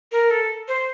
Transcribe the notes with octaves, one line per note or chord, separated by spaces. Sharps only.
A#4
A4
C5